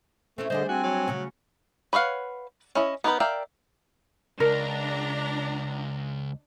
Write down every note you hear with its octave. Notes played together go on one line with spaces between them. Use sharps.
A3 C4 C#4 E4
D3 G3 D4 G#4 C5 D#5
C4 F#4 G#5
F#3
C#3 C#4 F#4
B4 C#5 D#5 F5 F#5
C#4 E4 D#5
B3 D#4 G4 A#4 B4
A#4 D5 E5 F5 G5
C#2 D4 A#4 A#5